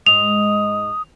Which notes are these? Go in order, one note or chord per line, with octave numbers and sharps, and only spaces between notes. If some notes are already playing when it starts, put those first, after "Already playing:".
G#2 G#3 D#6 F7